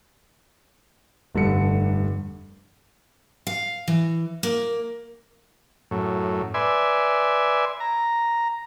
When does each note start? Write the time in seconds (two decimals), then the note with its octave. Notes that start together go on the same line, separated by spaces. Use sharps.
1.35 F1 G2 D3 C#7
3.47 F5
3.88 E3
4.43 A#3
5.91 F#2 A2
6.54 B4 D5 E5 G#5 C6
7.80 A#5